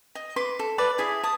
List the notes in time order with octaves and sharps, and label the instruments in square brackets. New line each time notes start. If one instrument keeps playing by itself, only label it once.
[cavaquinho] D#5
B4 C6 D6
A4
A4 B4 D5
E4 G#4 E5
A5 D#6